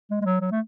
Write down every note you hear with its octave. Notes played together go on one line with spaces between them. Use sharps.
G#3
G#3
F#3
F#3
A3